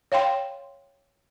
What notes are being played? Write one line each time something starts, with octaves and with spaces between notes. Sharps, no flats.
C#5 F5 G5 C6